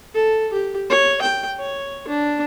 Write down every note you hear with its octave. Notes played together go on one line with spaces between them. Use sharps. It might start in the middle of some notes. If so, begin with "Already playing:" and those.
A4
G4
C#5
G5
C#5
D4